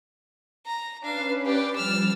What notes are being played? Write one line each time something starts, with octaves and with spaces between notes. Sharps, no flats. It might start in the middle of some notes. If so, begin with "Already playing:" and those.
A#5
C#4 D4 B4 F5
G4 D5
F3 G3 E6 F6 A6